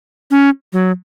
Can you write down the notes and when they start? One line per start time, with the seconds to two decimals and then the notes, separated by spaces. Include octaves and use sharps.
0.31 C#4
0.73 F#3